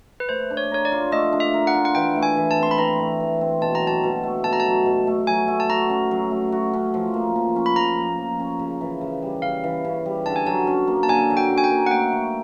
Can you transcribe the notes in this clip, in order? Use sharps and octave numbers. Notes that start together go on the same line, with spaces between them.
B4
A3 C5
D4
C#5
A#4 C#5
D5
F4
A3 D#5
D4
E5
A#4
F#5
F4
F#5
E3 G5
A3
G#5
E3
A5
C4 C6
B5
E3 A#5
A3
E3
C4
B2 A5
A#5
F#3
A5
B2
A3
B2 A5
A#5
A5
F#3
B2
A3
F#3 G#5
A3
A5
F#4 A#5
C#4
F#3
A3
F#4
C#4
F3
A#3
F3
C#4
B5
F3 A#5
A#3
F3
C#4
C#3
E3
C#3
G3
C#3 F5
E3
C#3
G3
D3 A5
G#5
F#3 A5
C#4
A#3
A5
D3 G#5
F#3
G5
C#4
G#5
G5
A#3
F#5
A3 G5
C#4